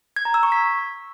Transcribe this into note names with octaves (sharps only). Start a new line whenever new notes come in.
G#6
A#5
E6
C#6
B6